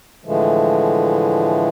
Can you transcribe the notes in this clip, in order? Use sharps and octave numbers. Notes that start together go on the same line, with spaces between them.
A2 D3 E3 F3 G#3 A3